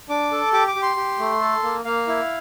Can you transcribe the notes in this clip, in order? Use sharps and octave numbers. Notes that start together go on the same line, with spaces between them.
D4 D6
A4
G4 D6
D6
G4
C6
G4
A3
A4
A#3
A#3 F5
E4